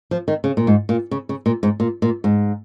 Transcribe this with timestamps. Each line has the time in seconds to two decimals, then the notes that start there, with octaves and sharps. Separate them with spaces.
0.11 F3
0.28 D#3
0.44 C#3
0.57 A#2
0.67 G#2
0.89 A#2
1.11 C#3
1.29 C#3
1.46 A#2
1.63 G#2
1.80 A#2
2.02 A#2
2.24 G#2